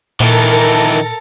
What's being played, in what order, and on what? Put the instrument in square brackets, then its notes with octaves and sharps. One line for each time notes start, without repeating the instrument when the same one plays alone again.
[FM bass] A#2 [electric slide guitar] D#3 E3 [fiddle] A4 [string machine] A#4 A5 A#5